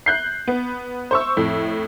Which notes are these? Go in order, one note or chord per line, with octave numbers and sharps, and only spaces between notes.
F#6 G6 C7
B3
C5 C#6 E6
F2 A2